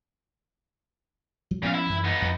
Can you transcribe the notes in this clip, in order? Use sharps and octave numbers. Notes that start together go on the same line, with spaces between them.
F#3
A#2 F3 B3 C#4 F5
E4
F#2 E3
B3 D#4
F2